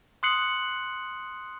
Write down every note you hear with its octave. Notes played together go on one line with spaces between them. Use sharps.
C6 D#6 F#6 C7 C#7 F#7